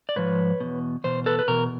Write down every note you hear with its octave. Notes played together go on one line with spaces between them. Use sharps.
D5
G#2 F3 B4 C#5
E2 B2
E2 B2 C5
A4 B4
B4
E2 B2 A#4